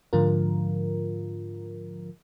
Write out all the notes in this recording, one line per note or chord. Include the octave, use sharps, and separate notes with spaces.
G#2 D3 F3 F4 A#4